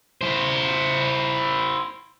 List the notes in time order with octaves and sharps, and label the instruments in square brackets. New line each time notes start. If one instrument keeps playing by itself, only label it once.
[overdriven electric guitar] E4 C5